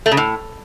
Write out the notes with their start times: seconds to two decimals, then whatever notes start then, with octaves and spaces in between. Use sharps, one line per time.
0.06 A3
0.12 C#3
0.17 A2